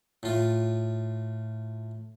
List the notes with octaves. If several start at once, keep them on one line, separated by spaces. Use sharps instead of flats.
A2 F4